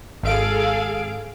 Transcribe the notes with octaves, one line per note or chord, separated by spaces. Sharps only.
G#1 G#4 A4 F5 D7